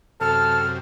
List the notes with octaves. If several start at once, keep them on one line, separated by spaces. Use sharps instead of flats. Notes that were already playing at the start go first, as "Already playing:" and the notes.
F#2 C3 A4 F6